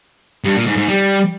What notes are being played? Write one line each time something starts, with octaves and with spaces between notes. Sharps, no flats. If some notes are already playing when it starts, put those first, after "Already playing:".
G2
A#2
G#2
G#2
G3